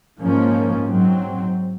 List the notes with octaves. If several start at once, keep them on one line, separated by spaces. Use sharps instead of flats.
G#2 F3 A#3 C#4
G#2 F#3 C4